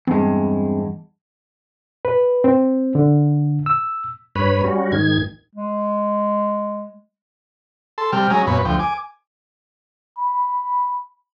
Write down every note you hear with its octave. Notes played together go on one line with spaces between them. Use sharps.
E2 G2 G#3 C4
B4
C4
D3
E6
G2 B4 C#5 B5
G3 C#4 F#4
G#2 D#3 G#6
G#3
A4 A5 C6
C3 G3 G5 F6
F#3 G#3 C#4 G#5 A#5
F#2 A#2 B3 C#5 B5
D2 F3 G5
G#5 D6
B5